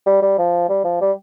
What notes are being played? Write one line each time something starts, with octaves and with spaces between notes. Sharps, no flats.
G3
G3
F3
G3
F3
G3